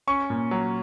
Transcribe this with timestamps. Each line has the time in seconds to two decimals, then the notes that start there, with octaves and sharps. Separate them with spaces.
0.07 C#4 C#6
0.30 A#2
0.51 F#3